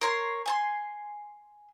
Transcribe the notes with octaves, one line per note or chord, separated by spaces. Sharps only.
A#4 C#5 C6
G#5 A5 C6